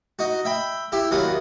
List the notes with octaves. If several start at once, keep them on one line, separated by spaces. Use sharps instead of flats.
D#4 F#4
E5 G5 B5
E4 G4 E5
D#2 C3 F#3 F5 B5 D#6